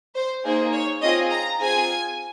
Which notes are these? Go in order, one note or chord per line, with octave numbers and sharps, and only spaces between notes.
C5
A#3 D#4 G#4 C5
C#5
C4 F4 G#4 D#5
A#5
C4 F4 G#4 G#5